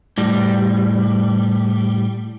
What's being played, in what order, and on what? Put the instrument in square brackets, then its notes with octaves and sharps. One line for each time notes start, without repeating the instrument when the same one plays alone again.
[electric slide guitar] A2 G3